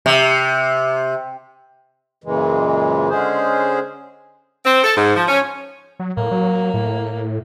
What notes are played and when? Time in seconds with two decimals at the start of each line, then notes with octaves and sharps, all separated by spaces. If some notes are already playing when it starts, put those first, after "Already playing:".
0.06 C3
2.24 F#2 A#2 C#3 E3 G#3
3.10 D3 G#3 C#4 G#4 C5
4.64 C4
4.84 A4
4.97 G#2
5.16 F3
5.28 C#4
5.99 F#3
6.17 A2 A#3
6.31 F#3
6.74 A2